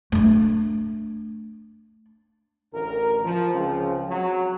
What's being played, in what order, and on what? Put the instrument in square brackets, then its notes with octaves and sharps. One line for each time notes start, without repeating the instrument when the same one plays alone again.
[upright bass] A3 D4
[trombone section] A1 D2 A#4
F3
C#2 C#3 F3 C4
F#3